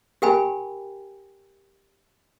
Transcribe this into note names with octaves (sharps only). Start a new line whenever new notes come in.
G4 A#4 G5 G#5 B5